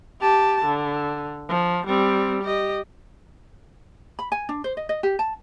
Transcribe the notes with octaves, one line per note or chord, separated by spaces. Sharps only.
G4 A5
D3
F3
G3 C4
G4 D#5
B5
G#5
D4
C5
D#5
D#5
G4
A5